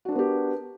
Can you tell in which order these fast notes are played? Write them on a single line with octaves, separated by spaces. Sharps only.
F#4 D4 A#4 B3 G4